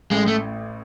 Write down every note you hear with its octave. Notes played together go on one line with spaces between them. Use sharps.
A1 A2 G#3
A3